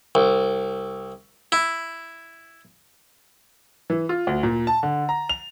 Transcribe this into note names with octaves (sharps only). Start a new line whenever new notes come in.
C2
E4
E3
F4
D2
A#2
A5
D3
A#5
F7